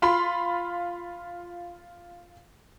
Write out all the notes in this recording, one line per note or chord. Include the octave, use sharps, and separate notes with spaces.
F4 B5 C6